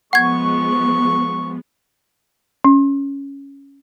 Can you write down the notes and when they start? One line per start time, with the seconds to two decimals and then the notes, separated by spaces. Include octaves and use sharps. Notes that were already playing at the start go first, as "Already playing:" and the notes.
0.13 F3 G#3 B3 F#5 C#6 G#6
2.65 C#4